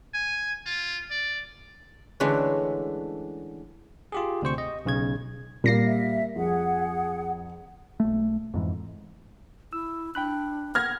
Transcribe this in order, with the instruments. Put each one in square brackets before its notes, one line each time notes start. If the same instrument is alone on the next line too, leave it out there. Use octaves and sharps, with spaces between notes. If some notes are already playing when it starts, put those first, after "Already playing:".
[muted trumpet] G#5
F4
D5
[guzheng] D3 E3 G#3 A3 C#4
[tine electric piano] F4 G4 G#4
D2 C3 C5 C#6
D#5
B1 C#3 G#6
[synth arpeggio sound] A#2 A#6 C7 [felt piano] G3 A#3
[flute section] E5
[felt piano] F2 [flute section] G#4 F#5
[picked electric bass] B1 A3
F2 G#2 E3
[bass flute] E4 [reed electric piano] E6
[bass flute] D4 [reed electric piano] G5 B5 F#6
[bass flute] F#5 [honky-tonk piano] F6 G#6 A#6